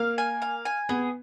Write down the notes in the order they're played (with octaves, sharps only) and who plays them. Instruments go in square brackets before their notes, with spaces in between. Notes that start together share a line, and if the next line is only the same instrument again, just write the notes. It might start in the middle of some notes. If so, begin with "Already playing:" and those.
Already playing: [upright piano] A#3 [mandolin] F5
[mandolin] G#5
F5
G#5
[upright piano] B3 [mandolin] G#4